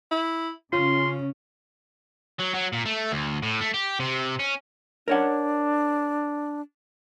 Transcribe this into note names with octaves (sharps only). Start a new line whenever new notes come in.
E4
C#3 C#4 F4 C6
F#3
F#3
A#2
A3
D2
A2
A3
G4
C3
C#4
D4 A#4 C#5 F#5